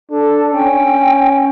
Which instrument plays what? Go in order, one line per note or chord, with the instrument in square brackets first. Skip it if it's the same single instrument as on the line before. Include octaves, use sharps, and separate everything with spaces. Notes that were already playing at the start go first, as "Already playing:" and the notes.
[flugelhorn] D4 [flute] A4
[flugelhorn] C#4 [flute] G5